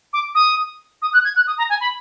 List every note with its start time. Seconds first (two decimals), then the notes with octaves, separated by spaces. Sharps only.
0.13 D6
0.35 D#6
1.02 D#6
1.13 F#6
1.25 G#6
1.36 F#6
1.47 D#6
1.58 A#5
1.69 G#5
1.81 B5